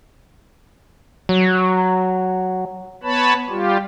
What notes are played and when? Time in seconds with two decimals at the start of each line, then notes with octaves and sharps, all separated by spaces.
1.29 F#3
3.03 B3 B4 C#5 A5 B5
3.49 G3 F4 G4